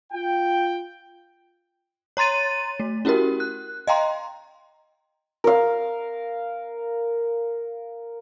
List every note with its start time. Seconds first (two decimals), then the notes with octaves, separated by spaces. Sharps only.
0.12 F4 G5
2.17 C#5 A#5 C6 A6 D#7
2.80 A3
3.05 C#4 E4 F#4 G4 A#4
3.40 F#6
3.87 D#5 F5 G5 A#5 C6
5.44 A#4 F5